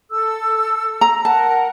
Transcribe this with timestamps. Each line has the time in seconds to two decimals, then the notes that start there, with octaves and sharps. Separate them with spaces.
0.11 A4 E6
1.01 A#5
1.25 A#4 F#5 A5